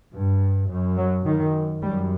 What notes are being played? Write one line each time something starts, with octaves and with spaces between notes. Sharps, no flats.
G2
F#2
F#3
F#2 D#3
F#2 G3